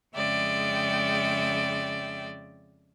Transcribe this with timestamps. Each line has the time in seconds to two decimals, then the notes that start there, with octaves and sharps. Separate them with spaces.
0.15 F2 C#3 G#3 D5 E5 G5